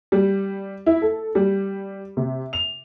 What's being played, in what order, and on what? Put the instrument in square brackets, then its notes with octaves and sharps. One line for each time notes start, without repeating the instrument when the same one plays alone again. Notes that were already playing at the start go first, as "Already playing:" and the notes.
[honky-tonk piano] G3
E4
A4
G3
C3
F7